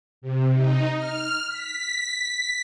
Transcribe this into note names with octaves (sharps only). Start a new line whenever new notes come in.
C3
D#4
F6
B6